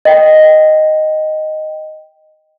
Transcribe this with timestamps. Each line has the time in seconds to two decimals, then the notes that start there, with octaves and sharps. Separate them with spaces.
0.05 D#5 G5